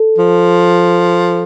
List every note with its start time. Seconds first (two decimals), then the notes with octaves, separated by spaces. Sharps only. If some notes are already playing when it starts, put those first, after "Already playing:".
Already playing: A4
0.18 F3